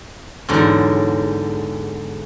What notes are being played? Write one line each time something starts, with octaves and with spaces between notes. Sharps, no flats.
E2 G#2 D3 F#3